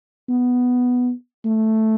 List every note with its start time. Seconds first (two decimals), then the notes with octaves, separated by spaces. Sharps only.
0.29 B3
1.45 A3